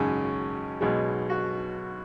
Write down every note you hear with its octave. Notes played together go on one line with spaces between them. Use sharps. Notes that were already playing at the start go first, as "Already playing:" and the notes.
Already playing: G#1 F#2 C#3 C#4
B1 B2 G#3
F#4